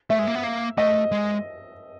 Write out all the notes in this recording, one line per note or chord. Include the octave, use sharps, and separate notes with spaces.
A3 E5
G#3
A#3
B3
A#3
A3 D#5
G#3